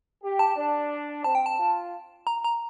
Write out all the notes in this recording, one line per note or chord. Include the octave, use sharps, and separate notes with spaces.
G4
A5
D4
C4 A5
G5
A5
F4
A#5
A#5